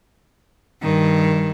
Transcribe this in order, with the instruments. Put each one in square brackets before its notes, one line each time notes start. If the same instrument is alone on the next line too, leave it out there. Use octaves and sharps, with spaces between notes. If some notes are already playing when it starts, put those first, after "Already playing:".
[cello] G2 D#3